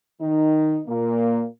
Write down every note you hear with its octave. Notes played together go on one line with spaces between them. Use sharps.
D#3 D#4
A#2 A#3